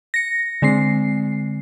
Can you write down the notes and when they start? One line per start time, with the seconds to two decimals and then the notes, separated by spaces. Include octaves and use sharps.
0.14 A#6 C#7
0.62 D3 G#3 C4 C7